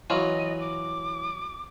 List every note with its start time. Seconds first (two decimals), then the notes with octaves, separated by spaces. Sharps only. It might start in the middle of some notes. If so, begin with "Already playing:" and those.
0.10 E3 F#3 F4 D#5
0.60 D6